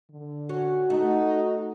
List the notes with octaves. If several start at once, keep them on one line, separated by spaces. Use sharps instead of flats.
D3
C#4 F#4
A3 D#4